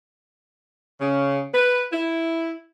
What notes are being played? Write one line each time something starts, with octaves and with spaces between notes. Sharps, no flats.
C#3
B4
E4